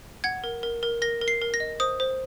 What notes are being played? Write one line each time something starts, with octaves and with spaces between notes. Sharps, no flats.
F#5 G#6
A#4
A#4
A#4
A#4 A#6
A#4
C7
A#4
A#6
D#5
C5 D#6
C5